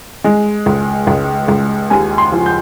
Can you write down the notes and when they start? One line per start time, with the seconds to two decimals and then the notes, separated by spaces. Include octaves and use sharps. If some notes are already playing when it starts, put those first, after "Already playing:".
0.24 G#3
0.66 C#2
1.07 C#2
1.48 C#2
1.90 D#2 G#5
2.18 C6
2.32 F3
2.46 G6